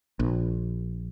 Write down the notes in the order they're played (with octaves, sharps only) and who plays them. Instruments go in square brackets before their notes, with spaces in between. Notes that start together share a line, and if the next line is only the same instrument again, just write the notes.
[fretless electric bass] A#1